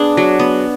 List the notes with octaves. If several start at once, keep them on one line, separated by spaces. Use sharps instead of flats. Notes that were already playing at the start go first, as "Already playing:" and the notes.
Already playing: B3 D4 G#4
F#3
B3